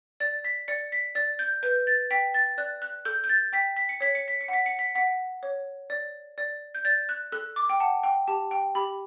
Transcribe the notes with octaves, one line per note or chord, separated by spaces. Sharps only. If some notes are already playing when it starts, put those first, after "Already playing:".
D5 A6
B6
D5 C#7
B6
D5 A6
G6
B4 G6
A6
G5 B6
A6
D5 F#6
F#6
A4 G6
G6
A6
G5 B6
B6
C#7
C#5 B6
C#7
B6
C#7
F#5 B6
C#7
B6
F#5 B6
C#5
D5
D5
G6
D5 A6
F#6
A4 F#6
D6
G5
F#5 A5
G5
G4 A5
G5
G4 B5